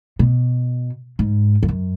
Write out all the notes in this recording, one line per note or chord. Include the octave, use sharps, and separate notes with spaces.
B2
G#2
F2
F#2